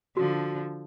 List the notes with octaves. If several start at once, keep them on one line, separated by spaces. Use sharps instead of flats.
D3 F3 F#4